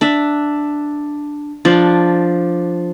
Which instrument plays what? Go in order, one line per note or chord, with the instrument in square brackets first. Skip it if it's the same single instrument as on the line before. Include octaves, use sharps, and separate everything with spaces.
[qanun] D4 E5
F3 D4